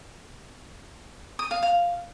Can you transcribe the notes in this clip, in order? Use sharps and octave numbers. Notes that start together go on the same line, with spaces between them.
D#6
F5
F5